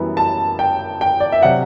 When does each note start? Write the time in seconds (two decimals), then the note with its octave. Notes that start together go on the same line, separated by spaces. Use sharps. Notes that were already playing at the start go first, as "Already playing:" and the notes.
Already playing: F#2 E3 G3 B3
0.17 A5
0.59 G5
1.01 G5
1.20 D5
1.32 E5
1.43 C3 F#3 F#5